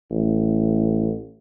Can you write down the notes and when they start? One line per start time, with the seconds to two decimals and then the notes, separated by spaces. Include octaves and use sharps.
0.11 A1